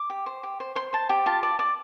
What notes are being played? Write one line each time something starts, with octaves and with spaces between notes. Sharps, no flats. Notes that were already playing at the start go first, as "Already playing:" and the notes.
Already playing: D6
G4
C5
G4
C5
C5 C6
C5 A5
G4 G5
F4 A5
D5 A5
D5 D6